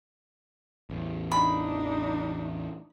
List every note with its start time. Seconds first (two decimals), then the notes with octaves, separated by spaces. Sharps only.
0.90 A1 E2
1.32 D4 D#4 B5